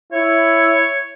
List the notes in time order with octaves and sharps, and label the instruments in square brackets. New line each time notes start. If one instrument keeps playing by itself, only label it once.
[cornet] E4 [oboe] C#5